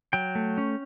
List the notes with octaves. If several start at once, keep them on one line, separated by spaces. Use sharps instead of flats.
F#3 G5
A3
C#4